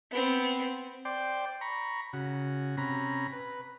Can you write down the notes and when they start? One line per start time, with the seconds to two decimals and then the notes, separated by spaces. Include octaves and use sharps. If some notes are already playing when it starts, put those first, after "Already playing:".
0.11 B3 C4
1.05 C5 D5 G5
1.61 A#5 B5 C#6
2.13 C#3 F#4
2.77 C3 C#4 A#5 B5
3.33 B4